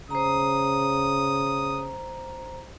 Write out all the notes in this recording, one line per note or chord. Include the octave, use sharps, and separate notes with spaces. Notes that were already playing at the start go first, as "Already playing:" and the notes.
C#3 C5 A#5 D#6